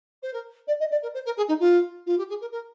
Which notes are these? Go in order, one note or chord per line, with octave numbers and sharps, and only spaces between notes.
C5
A#4
D5
D#5
D5
A#4
C5
A#4
G#4
D#4
F4
F4
G4
G#4
A#4
A#4